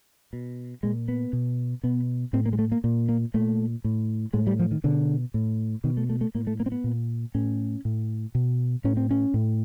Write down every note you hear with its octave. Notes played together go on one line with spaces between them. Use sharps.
B2
A#2 G#3
B3
B2
B2 B3
A2 C4
A#3
G#3
A3
A#3
A#2
A#3
A#2 A3
A2
A2 G#3
G3
F3
D#3
B2 D3
A2
B2 D#3
A3
A3
A3
A2 A#3
A3
A#3
C4
B3
A#2
A2 C#4
A2
B2
A2 C#4
C4
C#4
A2